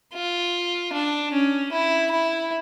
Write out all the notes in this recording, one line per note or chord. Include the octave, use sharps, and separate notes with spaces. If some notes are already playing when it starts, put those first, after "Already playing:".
F4
D4
C#4
E4
E4